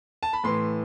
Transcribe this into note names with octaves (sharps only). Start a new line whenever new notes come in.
A5
B5
A2 E3 C6